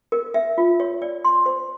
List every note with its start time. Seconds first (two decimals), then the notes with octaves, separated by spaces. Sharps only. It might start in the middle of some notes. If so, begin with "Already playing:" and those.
0.12 A#4
0.34 E5
0.58 F4
0.80 C#5
1.02 D5
1.24 C6
1.46 C5